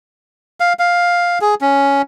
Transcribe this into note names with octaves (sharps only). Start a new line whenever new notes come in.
F5
F5
G#4
C#4